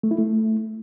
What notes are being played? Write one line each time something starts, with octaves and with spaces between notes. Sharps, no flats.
A3
E4
A3